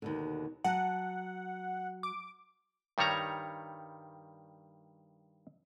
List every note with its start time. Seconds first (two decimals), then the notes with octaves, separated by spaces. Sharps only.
0.02 D#2 B2 D3
0.64 F#3 F#5 A5
2.03 D6
2.98 G2 D#3 G3 C#5 A#5